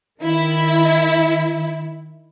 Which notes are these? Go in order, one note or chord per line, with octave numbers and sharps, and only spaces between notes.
D#3 E4